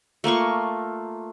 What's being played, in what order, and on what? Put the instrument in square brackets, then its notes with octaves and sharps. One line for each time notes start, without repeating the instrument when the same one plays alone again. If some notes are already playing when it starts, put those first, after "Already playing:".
[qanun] A3 A#3 F4 C#6